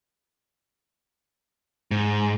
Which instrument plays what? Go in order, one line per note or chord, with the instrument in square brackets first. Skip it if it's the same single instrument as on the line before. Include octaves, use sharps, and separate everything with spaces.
[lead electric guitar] G#2